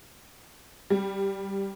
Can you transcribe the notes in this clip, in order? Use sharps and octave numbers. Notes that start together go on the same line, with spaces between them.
G3